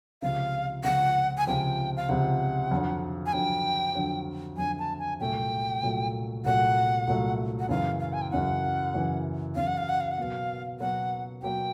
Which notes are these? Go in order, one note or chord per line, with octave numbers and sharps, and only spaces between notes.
C#2 C3 F3 F5
C#2 C3 F3 F#5
G#5
C#2 C3 F3 G5
F5
C#2 C3 F3 F#5
F2 D3 F#3
G#5
F2 D3 F#3 G5
F2 D3 F#3
F2 D3 F#3 G#5
A5
G#5
C2 A#2 F#3 A3 G5
C2 A#2 F#3 A3
C2 A#2 F#3 A3 F#5
C2 A#2 F#3 A3
F#5
F#2 C#3 E3 F5
F5
G#5
G5
F#2 C#3 E3 F#5
F#2 C#3 E3
F#2 C#3 E3 F5
F#5
F5
F#5
F5
F#5
B2 F#3 A#3 F5
B2 F#3 A#3 F#5
B2 F#3 A#3 G5